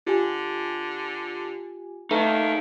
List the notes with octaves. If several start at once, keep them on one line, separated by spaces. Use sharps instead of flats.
D3 F4 G4 G#5
D#3 A3 D#4 B4 F5